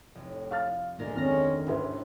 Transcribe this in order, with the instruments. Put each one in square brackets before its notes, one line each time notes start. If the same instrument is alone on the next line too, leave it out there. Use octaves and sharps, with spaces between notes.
[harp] F1 [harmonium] A2
[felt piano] F5 F6 A6
[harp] D2 A#4 A6 [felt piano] A#2 [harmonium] G#3
[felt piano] F2 D#3 [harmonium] G#3 C#4 [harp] F6 A#6
[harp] G1 G#2 [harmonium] C3 [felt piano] C#4 E4 C5